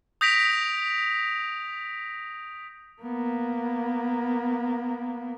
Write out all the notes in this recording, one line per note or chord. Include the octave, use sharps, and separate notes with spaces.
D#6 G6 A#6 B6 D7 F7
A#3 B3